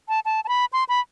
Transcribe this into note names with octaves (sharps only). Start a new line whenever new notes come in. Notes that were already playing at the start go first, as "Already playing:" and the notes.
A5
A5
A5
B5
C6
B5